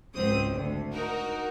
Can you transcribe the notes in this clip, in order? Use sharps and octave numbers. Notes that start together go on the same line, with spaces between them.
G#1 C#2 F#3 C4 D#6
D2
D#4 F#4 A#4